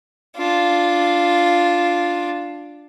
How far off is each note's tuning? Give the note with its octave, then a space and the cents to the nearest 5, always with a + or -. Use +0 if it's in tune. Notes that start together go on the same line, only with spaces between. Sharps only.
D4 +0 F4 +0